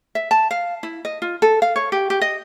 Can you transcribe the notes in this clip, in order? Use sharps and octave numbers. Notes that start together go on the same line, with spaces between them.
E5
A5
F5
E4
D#5
F4
A4
F5
C#5
G4
G4
D#5